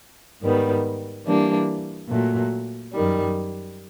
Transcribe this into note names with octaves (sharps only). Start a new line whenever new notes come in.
G#2 D#3 G3 B3
E3 G3 A#3 D4
A#2 F#3 A3
F#2 D#3 G3